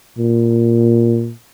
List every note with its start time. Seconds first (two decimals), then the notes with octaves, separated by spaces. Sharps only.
0.18 A#2